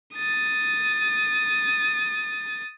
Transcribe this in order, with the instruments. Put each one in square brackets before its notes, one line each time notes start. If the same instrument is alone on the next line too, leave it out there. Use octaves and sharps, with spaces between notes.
[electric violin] D#6 A6